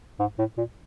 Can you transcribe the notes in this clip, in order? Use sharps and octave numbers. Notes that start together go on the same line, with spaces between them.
G#2
A2
A#2